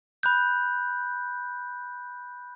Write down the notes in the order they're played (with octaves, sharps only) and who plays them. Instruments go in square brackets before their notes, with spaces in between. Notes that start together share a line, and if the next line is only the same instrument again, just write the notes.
[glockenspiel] B5 F#6 G6